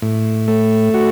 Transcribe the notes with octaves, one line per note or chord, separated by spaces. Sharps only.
A2
A3
F#4